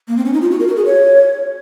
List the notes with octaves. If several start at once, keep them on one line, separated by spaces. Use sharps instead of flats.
A#3
C4
C#4
D#4
F4
F#4
A#4
F#4
G#4
C#5